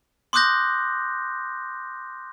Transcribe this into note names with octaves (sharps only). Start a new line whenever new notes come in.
C6 D6 D#6 F#6 G6 A#6